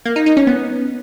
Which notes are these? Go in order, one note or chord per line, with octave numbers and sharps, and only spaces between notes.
A#3
D#4
D#4
C#4
B3